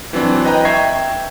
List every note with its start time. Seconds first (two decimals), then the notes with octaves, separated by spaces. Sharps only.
0.13 E3 F#3 C4 D4
0.44 B4 D#5 G5 A#5
0.65 E5 G5 A#5 C#6 G#6 C7